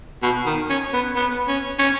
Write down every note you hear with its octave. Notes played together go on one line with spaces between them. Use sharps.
B2
D#3
C#4
B3
B3
C#4
C#4